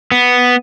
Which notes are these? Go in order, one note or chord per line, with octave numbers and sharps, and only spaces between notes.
B3